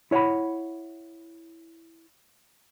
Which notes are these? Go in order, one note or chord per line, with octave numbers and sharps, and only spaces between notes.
E4 C#5 D#5 F#5 B5